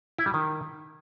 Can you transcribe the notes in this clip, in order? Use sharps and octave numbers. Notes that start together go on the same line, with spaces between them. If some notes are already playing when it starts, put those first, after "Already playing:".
E4
G3
D#3